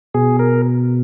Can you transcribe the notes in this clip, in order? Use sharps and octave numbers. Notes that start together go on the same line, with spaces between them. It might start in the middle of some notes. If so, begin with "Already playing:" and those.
B2 G#4
A#4